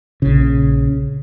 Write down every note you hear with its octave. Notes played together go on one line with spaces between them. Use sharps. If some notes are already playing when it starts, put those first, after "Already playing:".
A#1 C#3